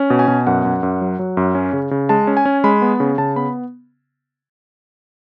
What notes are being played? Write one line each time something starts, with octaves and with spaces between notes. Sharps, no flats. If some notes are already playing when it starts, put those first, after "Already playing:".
Already playing: C#4
B2
G#5
B2
F#2 F#5
F#2
F#2
F#3
F#3
F#2
C#4
C#3
C#3
G#3 A5
C#4
G#5
C#4
G#3 B5
B3
C#3
C#3 A5
B3 B5